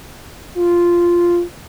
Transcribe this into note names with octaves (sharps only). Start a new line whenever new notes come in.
F4